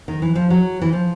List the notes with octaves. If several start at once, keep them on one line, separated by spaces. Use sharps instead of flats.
D#3
E3
F3
F#3
E3
F3